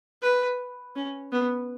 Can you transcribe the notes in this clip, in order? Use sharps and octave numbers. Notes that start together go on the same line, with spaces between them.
B4
C#4
B3